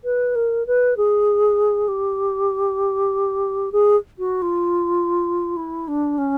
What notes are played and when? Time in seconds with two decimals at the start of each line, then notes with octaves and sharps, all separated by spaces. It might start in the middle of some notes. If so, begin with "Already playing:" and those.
0.04 B4
0.35 A#4
0.66 B4
0.97 G#4
1.88 G4
3.72 G#4
4.19 F#4
4.42 F4
5.56 E4
5.88 D4
6.18 C#4